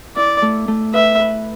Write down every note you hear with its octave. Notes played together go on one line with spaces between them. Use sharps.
E4 D5
A3
A3
B4 E5
B4